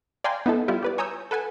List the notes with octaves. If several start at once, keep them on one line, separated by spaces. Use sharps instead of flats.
D5 F5 G5 G#5 A#5 C6
B3 D#4 E4 A4
G3 E4 F4 G4
G4 B4 D5
C#5 G#5 A#5 D#6 E6 G6
A4 B4 F#5 G#5